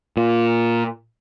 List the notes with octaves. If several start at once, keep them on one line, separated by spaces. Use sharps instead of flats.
A#2